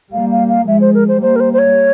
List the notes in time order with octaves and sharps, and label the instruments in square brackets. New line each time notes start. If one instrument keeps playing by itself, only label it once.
[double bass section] G3 A#3 [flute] F5
[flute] F5
F5
[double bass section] F3 G#3 [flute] E5
[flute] C5
A#4
C5
[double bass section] G3 A#3 [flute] C5
[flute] A#4
C5
C5
C#5